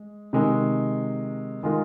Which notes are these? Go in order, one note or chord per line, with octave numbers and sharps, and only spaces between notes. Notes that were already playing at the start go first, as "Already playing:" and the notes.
Already playing: G#3
C3 D#3 G#3
D#3 G#3 F4 A#4